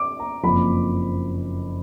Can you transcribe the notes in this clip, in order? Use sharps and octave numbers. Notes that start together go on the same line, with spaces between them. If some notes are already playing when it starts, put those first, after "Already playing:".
Already playing: D6
A#5
F#1 F2 F3 B5